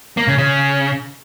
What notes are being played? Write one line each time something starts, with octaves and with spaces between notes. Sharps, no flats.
A#3
C#3
C#3